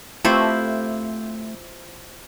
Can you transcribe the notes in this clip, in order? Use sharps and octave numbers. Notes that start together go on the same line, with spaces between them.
A3 C4 E4 F4 G4 C5